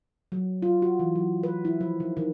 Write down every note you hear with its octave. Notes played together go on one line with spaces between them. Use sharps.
F#3
F4
F#4
E3
F#3
B4
E4
F3
D#3
D#3